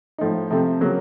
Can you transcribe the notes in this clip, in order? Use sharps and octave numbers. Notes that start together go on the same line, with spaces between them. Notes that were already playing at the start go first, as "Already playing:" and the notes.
A2 F3 A3 D#4
C3 F3 A3 C4
C#3 F#3 A#3